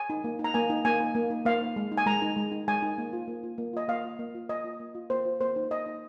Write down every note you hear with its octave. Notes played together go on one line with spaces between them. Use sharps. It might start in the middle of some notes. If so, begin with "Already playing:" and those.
Already playing: G#5
D#4
A#3
D#4
A#5
A#3 G#5
D#4
A#3 G#5
D#4
A#3
D#4
A#3 F5
D#4
G#3
D#4
G#5
G#3 A#5
D#4
G#3
D#4
G#3 G#5
D#4
A#3
F4
A#3
F4
A#3
F4 D#5
A#3 F5
F4
A#3
F4
A#3 D#5
F4
A#3
F4
A#3 C5
F4
A#3 C5
D#4
A#3 D#5
D#4